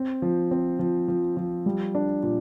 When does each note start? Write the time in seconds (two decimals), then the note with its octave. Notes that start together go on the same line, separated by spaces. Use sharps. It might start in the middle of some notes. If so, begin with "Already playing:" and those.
Already playing: C4
0.22 F3
0.51 C4
0.79 F3
1.08 F3
1.37 F3
1.66 G3
1.95 D4
2.23 A#2